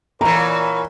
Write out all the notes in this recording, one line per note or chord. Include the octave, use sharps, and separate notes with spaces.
A#2 E3 A#4 C#5 A#5 B5